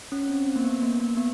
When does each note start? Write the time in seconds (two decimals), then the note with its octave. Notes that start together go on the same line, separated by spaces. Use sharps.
0.12 C#4
0.29 C4
0.46 C4
0.56 A#3
0.64 B3
0.82 A#3
1.00 A#3
1.17 B3